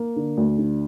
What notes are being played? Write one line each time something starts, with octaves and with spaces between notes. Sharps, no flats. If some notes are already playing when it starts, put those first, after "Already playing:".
Already playing: A#3
D3
D2
D3